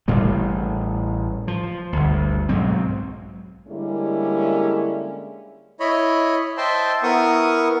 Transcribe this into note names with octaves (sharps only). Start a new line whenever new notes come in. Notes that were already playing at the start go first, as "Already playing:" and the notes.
A1 A2 G3 A3
F3
G1 D2
B1 G#2 F#3 C4
D3 G3 G#3 A#3 C#4 E4
E4 C#5 D#5 B5
C5 D#5 E5 G5 A5 C6
B3 E4 A#4 C#6 D#6